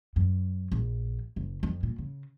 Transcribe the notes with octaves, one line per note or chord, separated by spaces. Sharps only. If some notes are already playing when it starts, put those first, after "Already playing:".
F#2
A#1
F#1
F2
A#2
C#3